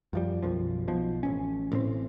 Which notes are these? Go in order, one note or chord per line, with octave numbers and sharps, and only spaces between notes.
F#2 F3 G3
B1 F#2 F3
B1 B2 F3
A1 C#4
A1 A2 C4